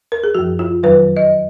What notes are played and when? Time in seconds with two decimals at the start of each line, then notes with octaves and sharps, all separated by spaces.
0.12 A#4
0.24 G#4
0.35 F#2 F3 F#4
0.59 F4
0.83 F2 D#3 F#3 B4
1.17 D#5